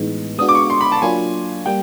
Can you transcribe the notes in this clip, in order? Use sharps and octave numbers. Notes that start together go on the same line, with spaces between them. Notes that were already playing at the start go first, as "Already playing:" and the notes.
Already playing: A2 E3 G#3 B3 D#4
G#3 B3 D4 F#4 D#6
D6
C#6
C6
B5
A5
F#3 A#3 D4 F4 G#5
G3 A#3 G5